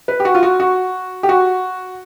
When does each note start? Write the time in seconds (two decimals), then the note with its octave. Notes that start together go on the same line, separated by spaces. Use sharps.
0.08 B4
0.20 G4
0.25 F#4
0.35 F4
0.43 F#4
0.60 F#4
1.23 G4
1.29 F#4